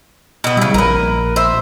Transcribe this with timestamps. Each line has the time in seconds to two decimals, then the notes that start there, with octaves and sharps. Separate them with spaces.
0.44 B2 B3
0.57 C#3 G3 E4
0.74 A#1 A#4 B4
1.36 C5 E5